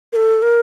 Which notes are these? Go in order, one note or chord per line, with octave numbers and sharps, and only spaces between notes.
A#4
A4
A#4